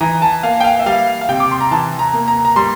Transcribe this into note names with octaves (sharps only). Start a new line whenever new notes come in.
E3 A#5
A5
A#3 F5
G5
F5
E5
G3 F5
F5
C3 G5
D6
C6
A#5
E3 A5
A#5
A#3
A#5
A#5
G3 C6